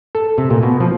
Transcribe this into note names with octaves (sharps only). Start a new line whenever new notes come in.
A4
C3
A#2
B2
F3